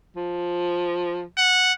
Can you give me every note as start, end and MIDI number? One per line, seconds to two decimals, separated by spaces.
0.16 1.23 53
1.38 1.73 78